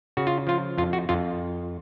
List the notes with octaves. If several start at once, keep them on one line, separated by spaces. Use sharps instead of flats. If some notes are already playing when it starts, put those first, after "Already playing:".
C#3 F#4
F4
F3 F4
F2 F4
F#4
F2 F4